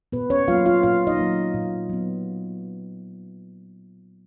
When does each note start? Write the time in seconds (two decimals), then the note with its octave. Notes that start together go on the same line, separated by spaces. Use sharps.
0.12 A#2 B3 B4
0.30 C#4 C#5
0.48 F#3 A#3 F4 F5
0.66 F4 F5
0.83 A#2 F4 F5
1.07 D#4 D#5
1.19 F#3 A#3
1.54 A#2
1.89 F#3 B3